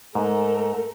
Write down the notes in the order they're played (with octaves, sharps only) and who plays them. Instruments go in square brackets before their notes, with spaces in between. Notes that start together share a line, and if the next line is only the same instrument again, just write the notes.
[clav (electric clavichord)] G#2 [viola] A3 A#4